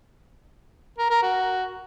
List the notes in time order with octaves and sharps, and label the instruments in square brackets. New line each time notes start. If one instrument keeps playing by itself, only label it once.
[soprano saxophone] A#4
A#4
F#4